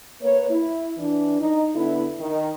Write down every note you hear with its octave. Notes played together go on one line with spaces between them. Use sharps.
A#3 B4 C#5
E4
E3 D4
D#4
D3 B3 E4
D#3